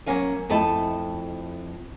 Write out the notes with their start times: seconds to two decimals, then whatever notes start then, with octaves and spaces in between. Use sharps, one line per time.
0.06 F#3 G#3 A#3 C#4 F5 G#5
0.49 F2 A3 E4 D#5 A5